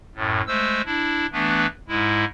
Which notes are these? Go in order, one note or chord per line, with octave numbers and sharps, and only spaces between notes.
F#2 A2
G#3 A3 C5 E6
D4 E4
E3 A3 B3 D4 B4
G#2 G#3 E4